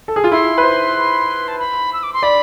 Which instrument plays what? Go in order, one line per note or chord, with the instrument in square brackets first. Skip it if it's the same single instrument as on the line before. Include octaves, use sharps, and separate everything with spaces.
[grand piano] A4
G#4
F4
[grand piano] E4 [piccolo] C6
[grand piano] B4
C5
[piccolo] A5
B5
E6
D6
C6
[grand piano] D5 [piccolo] B5